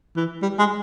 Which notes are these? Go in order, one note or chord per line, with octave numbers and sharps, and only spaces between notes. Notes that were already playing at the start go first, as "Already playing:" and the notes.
E3
G3
G#3